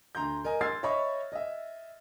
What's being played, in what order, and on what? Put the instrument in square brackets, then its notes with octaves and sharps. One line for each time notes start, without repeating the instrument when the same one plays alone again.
[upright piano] D2 A#5 C6 G6
A#4 D#5 G#5
C6 E6 F6 G#6 A6 C7
C#5 D#5 E5 B5 C#6
D#5 E5